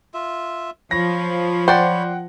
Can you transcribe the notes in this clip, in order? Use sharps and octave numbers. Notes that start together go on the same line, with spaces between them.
F4 E5
F3 C#5 B5 A#6
C5 D5 F#5 G5